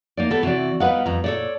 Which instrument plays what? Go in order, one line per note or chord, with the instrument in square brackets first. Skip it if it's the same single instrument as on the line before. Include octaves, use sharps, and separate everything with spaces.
[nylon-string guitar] A#3 D#4 D5
[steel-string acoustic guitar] G3 B3 [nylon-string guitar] A4
[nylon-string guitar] C3 E3 D5 [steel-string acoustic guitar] F#4
[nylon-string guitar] G3 B4 F#5 [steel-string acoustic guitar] B3 D#4 F5
[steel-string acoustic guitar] F2 A#5
[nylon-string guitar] A#2 [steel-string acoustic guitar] A4 C#5 D5